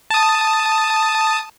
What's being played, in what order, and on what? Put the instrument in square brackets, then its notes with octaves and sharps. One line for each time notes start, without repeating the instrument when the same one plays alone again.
[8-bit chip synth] A5 D#6